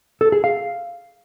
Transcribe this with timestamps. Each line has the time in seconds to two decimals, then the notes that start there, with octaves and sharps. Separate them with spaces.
0.21 A4
0.32 G#4
0.44 F5